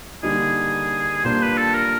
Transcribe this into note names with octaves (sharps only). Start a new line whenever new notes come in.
D3 G3 A#3 D#4 G#4
A#2 G3 A#3 D4 C5
B4
A4
A#4